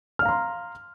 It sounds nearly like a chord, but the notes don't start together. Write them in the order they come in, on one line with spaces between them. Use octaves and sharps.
F6 F5 A#5 C6